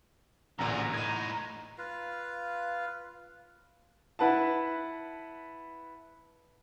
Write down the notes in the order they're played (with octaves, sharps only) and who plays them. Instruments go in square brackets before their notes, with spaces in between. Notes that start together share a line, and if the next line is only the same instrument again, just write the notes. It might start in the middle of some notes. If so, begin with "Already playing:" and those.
[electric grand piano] A1 D2 A#2 [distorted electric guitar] D3 G#4 [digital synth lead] A#5
[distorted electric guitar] A2 D#4 [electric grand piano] G#6 D#7
[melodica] F4 B4 F5
[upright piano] E4 B4 F#5 A5